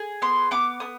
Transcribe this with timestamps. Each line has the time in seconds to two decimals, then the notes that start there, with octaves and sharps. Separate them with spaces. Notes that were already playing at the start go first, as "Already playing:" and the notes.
Already playing: G#4
0.22 B3 C6
0.51 B3 D6
0.80 B3 D#6